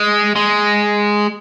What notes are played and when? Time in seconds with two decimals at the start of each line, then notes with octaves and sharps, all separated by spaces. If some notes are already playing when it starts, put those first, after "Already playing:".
Already playing: G#3
0.36 G#3